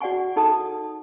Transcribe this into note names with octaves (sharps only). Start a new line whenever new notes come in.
F#4 D5 F#5 G#5 C#6
D#4 A4 A5 D#6